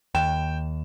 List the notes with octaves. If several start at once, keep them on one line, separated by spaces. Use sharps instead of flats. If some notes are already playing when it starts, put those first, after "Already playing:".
D#2 G5 E7